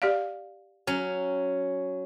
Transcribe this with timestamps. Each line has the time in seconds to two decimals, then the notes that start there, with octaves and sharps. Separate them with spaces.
0.02 G4 D5 F5
0.87 F#3 C#4